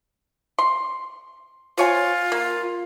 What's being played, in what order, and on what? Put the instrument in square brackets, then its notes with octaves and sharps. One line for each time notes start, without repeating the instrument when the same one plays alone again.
[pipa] C6
[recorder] F4 [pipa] C5 C#5 G#5
[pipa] A#3